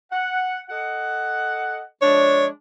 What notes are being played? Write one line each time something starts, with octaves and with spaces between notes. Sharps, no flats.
F#5
A4 D#5 F#5
F3 G#3 D4 C#5